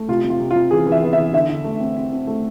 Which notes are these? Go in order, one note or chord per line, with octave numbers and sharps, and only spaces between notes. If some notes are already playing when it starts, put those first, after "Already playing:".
Already playing: A3
C3 F4
C3
F4
C3
C3 F4
E3 G#4
E3
E5
B3
E5
E3
D3 E5
D3
A3
C4
C4
C4
A3